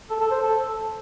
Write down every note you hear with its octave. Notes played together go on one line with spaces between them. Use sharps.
A4
A4
C5
A4